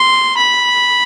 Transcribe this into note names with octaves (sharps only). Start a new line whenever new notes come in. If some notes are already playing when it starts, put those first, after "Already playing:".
Already playing: C6
B5